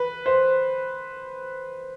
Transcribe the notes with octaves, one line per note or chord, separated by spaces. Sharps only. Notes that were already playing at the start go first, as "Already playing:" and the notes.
Already playing: B4
C5